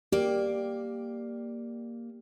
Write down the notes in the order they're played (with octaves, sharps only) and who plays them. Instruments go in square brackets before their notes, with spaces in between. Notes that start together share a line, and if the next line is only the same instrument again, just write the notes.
[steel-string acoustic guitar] A#3 D5 [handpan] G4